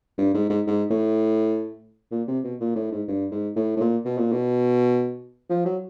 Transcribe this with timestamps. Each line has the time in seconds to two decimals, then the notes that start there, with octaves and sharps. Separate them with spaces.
0.18 G2
0.34 G#2
0.50 G#2
0.67 G#2
0.90 A2
2.11 A#2
2.28 C3
2.44 B2
2.60 A#2
2.76 A2
2.92 G#2
3.08 G2
3.32 G#2
3.56 A2
3.77 A2
3.80 A#2
4.05 B2
4.18 A#2
4.32 B2
5.50 F3
5.65 F#3